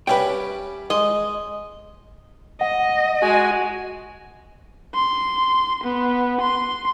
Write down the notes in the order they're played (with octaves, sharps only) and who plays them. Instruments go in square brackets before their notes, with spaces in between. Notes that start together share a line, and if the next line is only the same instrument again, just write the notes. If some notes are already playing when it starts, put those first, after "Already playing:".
[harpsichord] G3 C#4 G4 [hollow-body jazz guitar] B4 E5 G5
[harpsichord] G#3 [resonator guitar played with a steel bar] D#5
[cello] D#5 [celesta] F#5
[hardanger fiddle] G#3 G#5 [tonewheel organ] F#4
[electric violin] C6
B3
C6